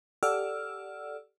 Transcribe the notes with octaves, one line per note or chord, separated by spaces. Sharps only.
G4 A4 D5 F#5 E6 F6